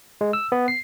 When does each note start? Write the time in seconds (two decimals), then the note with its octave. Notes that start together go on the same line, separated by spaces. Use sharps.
0.21 G#3
0.33 E6
0.52 B3
0.68 C7